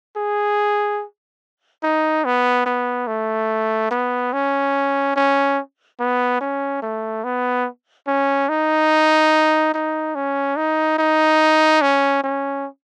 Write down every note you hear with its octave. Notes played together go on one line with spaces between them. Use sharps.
G#4
D#4
B3
B3
A3
B3
C#4
C#4
B3
C#4
A3
B3
C#4
D#4
D#4
C#4
D#4
D#4
C#4
C#4